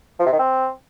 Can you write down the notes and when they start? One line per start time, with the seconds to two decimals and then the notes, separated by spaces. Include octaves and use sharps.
0.19 F3
0.26 C3
0.33 D#3
0.39 C4